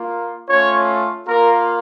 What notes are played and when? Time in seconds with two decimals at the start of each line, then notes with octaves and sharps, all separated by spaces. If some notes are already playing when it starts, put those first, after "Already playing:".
Already playing: A#3 F4
0.49 A3 C#4 F4 C#5
1.27 A#3 F4 A#4